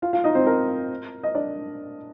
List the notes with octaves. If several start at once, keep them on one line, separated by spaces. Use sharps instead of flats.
F4 F5
F4 F5
D#4 D#5
C4 C5
A#4
D#5
D4 D5